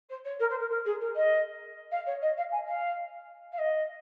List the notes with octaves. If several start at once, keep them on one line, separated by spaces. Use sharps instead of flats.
C5
C#5
A#4
C5
A#4
A#4
G#4
A#4
D#5
F5
C#5
D#5
F5
G#5
F5
F5
D#5